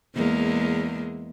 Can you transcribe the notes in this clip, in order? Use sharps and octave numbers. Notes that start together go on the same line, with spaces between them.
E2 G#3 A#3